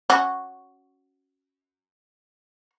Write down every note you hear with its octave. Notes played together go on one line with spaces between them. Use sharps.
C#4 F#4